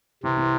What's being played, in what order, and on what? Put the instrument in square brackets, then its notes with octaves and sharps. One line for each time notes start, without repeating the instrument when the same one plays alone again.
[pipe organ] C3 [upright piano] E3
[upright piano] E3